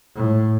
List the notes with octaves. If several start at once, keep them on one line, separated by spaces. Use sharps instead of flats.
A2